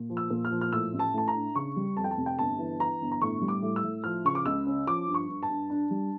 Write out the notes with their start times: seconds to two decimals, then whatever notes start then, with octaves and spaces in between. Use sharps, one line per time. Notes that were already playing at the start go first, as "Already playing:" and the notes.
Already playing: A#2
0.10 F3
0.17 E6
0.31 A#2
0.45 F6
0.51 F3
0.61 F6
0.72 A2 E6
0.93 A1
0.99 A5
1.14 A2 A5
1.28 A#5
1.35 D4
1.55 C#3 C#6
1.76 G3
1.97 F2 A5
2.04 G5
2.11 A5
2.17 F1
2.26 G5
2.38 G1 A5
2.59 E3
2.80 E3 A#5
3.01 G1
3.12 A#5
3.21 A2 C#6
3.42 G3
3.48 D6
3.62 A2
3.76 E6
3.84 A2
4.04 F3 F6
4.25 C#3 C#6
4.35 D6
4.46 C#2 E6
4.66 C#4
4.87 F3 D6
5.08 G2
5.14 C#6
5.29 G2
5.43 A5
5.50 G2
5.70 D4
5.90 G3